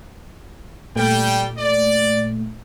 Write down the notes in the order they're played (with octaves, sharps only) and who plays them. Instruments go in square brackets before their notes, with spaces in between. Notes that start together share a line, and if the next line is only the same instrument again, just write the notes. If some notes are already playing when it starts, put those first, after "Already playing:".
[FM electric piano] A#2 A3 [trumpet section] G3 G5
[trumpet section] D5